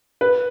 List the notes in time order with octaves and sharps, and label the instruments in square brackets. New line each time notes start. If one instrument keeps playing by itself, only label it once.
[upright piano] B4